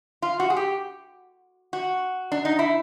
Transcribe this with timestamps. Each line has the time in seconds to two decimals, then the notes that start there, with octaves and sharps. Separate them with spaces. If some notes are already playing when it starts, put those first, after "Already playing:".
0.22 F4
0.40 F#4
0.50 G#4
0.56 G4
1.73 F#4
2.32 D4
2.45 D#4
2.59 E4